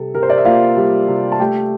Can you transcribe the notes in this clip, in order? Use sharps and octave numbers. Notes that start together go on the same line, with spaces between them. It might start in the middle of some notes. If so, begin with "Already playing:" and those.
Already playing: C3 G3 A4
C3 A#4
C5
D5
E5
A#3 F4 F5
G3
C3
A5
A3 G4 G5